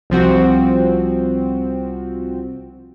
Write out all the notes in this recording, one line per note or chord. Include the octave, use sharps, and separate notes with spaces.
C2 F3 C4 F#4